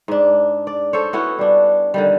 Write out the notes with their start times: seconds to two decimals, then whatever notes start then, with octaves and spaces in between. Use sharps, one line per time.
0.08 G#2 D4
0.67 D5
0.93 A4 C5 C#5
1.13 B3 C#4 E4 F#4
1.39 G3 D4
1.94 D3 D#3 G3